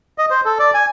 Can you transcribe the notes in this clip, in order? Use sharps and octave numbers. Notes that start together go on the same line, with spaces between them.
D#5
C5
A4
D5
G#5